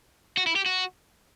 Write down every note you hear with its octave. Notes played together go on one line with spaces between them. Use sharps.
F#4
E4
G4
F#4